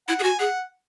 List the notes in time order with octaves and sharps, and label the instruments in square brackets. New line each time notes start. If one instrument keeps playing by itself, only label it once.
[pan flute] E4 [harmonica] F#5
[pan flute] G#4
[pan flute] F#4 [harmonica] G#5
[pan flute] G#4 [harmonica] F#5